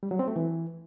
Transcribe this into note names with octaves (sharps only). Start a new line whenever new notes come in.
G3
F#3
C4
A3
E3